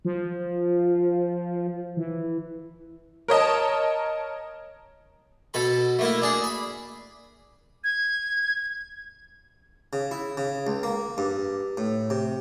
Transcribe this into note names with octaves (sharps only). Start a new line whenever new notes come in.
F3
E3
A#4 C#5 D#5 A5
B2 A4 B5
A3 A#3 E4
D4 G#4
B5
G#6
C#3
E4
C#3
C#2
A#3
G2
A2
C3